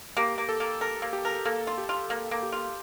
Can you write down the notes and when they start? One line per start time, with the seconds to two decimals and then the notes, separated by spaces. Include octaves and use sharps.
0.17 A#3 G4
0.38 A#3
0.49 A4
0.60 A#3
0.81 A4 A#4
1.02 A#3
1.13 G4
1.25 A#4
1.45 A#3 A4
1.67 F4
1.78 G4
1.89 F4
2.10 A#3
2.31 A#3
2.43 G4
2.52 F4